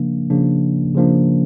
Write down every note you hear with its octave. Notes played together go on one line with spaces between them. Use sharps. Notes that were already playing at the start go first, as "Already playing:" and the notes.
Already playing: C#3 F3 A#3 D4
C#3 F3 A#3 D4
C#3 F3 A#3 D4